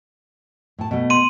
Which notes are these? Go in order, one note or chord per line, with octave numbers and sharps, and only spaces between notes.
A2 A5
B2 A3
C6 D#7